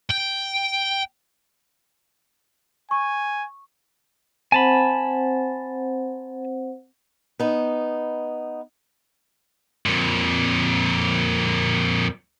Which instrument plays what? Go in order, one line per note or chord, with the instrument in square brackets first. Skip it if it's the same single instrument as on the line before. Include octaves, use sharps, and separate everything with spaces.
[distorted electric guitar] G5
[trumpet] G#5 [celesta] C#6
[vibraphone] C4 C5 F#5 [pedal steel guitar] G#5 A5 B5
[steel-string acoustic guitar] B3 D#4
[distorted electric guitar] F2 A#2